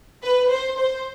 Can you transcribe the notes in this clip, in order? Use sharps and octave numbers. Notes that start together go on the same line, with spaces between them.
B4
C5
C5